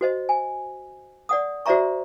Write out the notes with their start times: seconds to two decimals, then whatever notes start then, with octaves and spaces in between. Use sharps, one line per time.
0.01 F#4 C5 D#5
0.29 G#5
1.29 D5 F#5 D#6
1.66 F#4 C5 D5 E5 A#5 C#6